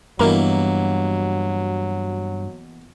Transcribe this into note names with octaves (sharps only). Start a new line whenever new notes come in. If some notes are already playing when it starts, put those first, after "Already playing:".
G2 B2 E3 F#3 A#3 E4 A#4 A#5